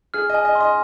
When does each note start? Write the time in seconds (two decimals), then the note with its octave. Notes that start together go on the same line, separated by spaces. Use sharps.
0.14 G#4 F6
0.29 D#5
0.35 G#5
0.45 D#5
0.55 C6
0.60 D#5